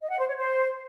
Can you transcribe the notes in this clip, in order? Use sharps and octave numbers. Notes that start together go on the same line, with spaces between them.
D#5
F#5
C5
C#5
C5